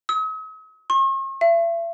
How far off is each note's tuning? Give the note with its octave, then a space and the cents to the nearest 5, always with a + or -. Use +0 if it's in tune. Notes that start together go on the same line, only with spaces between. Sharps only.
D#6 +45
C#6 -45
E5 +35